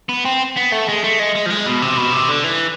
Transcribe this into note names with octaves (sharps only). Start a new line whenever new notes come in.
B3
C4
B3
A3
G#3
A3
G#3
G#3
F3
G#3
B2
C3
B2
C3
D3
E3